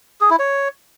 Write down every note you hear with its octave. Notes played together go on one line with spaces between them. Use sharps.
G#4
E4
C#5